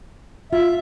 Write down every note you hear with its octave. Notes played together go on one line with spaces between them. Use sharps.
F4 E5